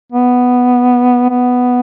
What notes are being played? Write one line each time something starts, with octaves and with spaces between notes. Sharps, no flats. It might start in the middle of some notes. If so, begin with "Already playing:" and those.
B3
B3